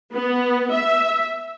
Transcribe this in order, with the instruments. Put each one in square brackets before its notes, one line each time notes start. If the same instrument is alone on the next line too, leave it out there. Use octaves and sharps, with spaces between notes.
[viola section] B3
E5